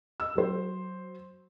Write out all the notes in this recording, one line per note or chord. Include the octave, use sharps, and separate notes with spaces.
D#5 E6
F#3 C5